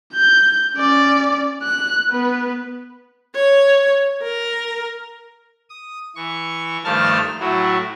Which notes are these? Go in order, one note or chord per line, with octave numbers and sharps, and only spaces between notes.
G6
C#4 D5
F#6
B3 B4
C#5
A#4
D#6
E3 C#6
G2 D#3 F3 A3 A5 F6
A2 F#3 E4 F#4